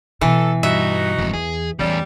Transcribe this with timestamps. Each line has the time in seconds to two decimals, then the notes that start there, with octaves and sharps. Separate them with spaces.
0.21 B2 E3 A4
0.63 G2 D#4 F#4 E5
1.18 F#1 F2 G#2
1.33 E2 G#4
1.79 E2 E3 G3 A3 C#4